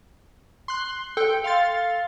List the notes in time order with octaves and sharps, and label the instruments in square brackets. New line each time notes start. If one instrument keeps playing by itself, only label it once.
[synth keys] C6 F#6
[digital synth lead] A4 [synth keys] G5
[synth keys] F5 C6 A6